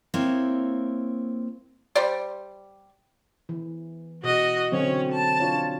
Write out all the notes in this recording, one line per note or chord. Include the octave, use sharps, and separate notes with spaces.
A#3 C4 E4 C#5 D5
G3 G4 C5 D5
E3
B2 F#4 D#5
D3 F#3 C4 C#4 C#5
A5
D4 F4 C#5